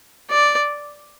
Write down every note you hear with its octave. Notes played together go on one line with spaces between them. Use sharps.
D5